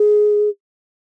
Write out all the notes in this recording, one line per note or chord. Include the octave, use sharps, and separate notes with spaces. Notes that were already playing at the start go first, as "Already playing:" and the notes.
Already playing: G#4